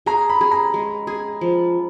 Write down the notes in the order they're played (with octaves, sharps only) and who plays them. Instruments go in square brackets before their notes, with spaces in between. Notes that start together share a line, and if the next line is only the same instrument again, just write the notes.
[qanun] G#4 [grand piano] A#5
[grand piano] B5
[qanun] G#4
[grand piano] A#5
[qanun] G#3
G#4
F3